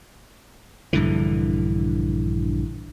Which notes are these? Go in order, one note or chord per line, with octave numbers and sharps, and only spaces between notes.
A#1 G2 D3 E3